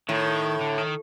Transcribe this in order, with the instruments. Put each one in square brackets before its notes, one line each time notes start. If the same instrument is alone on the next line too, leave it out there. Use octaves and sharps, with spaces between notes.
[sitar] A2 [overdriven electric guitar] D#3
[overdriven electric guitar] D3
D#3